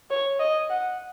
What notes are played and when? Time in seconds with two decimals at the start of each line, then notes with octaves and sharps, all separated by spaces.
0.10 C#5
0.40 D#5
0.70 F#5